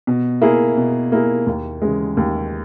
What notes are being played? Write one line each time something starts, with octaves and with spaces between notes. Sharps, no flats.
B2
A#3 E4 G#4
B2
A#3 E4 G#4
D#2
C#3 E3 G#3
D#2